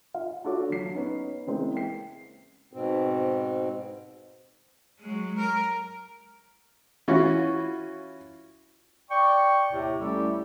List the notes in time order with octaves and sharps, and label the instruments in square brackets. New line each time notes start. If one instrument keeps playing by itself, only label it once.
[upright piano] F4 F5
D4 F4 F#4 A4 C#5 D6
D3 F#3 C7
B3 C#4 D#4
C#3 E3 G#3 A#3 C4
G5 C7
[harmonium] G#2 B2 C4
[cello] F#3 G#3
A#4
[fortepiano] E3 C#4 F4 F#4
[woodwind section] D5 G5 C#6
D#2 A2 C3
G3 A3 C#4 E4 G4 A4